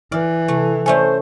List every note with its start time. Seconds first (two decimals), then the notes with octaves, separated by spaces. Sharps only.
0.12 E3 D5 F6
0.48 C3 A3
0.86 A3 C#4 A4 C5 D5 E5 G#5